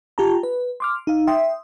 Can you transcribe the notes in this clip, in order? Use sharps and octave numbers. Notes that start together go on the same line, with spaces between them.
F4 G4 G5 A5 A#5
B4
C6 D6 F6
D#4 F5
E5 G5 C6 D#6